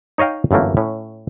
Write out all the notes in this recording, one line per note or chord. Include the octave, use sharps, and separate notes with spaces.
D#4 C#5 D#5 F5 G5
G1 F#2 E3 A3 A#3
A2 C#4